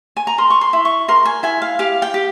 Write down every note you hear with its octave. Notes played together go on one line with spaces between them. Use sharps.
G#5
A#5
A#4 C6
C#6
C6
E4
C#6
A#4 C6
G#5
E4 G#5
F5
G4 F5
G5
G4